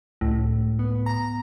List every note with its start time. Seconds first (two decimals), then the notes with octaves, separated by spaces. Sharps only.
0.21 C#2 A2
0.79 B3
1.06 A#5